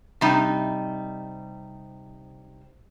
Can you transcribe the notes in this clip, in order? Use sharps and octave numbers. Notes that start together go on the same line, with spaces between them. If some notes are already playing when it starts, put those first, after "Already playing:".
C3 G3 D#4